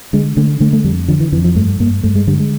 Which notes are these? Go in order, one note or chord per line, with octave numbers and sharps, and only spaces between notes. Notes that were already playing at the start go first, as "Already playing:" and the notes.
D3 G#3
D3 A3
D3 A3
A3
F2 G3
D3 F3
E3
F2 E3
F3
G2 A3
G2 A#3
G2 A3
G#3
D3 G3
G#3